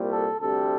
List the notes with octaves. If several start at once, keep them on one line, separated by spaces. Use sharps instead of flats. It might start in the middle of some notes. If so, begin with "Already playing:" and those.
Already playing: C2 A#2 G3
A4
D2 C3 G3 A4